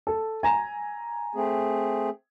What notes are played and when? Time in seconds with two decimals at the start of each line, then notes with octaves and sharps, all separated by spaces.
0.07 A4
0.43 G#5 A#5
1.35 A3 C4 G#4